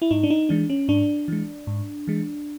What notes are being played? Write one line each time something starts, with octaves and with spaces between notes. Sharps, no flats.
E4
G#2 D#4
D4
D#4
E3 G#3 D4
C#4
G#2 D4
E3 G#3
G#2
E3 G#3